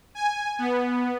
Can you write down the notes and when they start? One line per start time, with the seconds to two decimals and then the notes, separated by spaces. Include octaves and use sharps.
0.15 G#5
0.59 B3